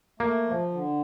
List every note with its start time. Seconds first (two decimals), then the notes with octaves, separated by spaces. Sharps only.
0.20 A3 A#3
0.46 F3
0.72 D3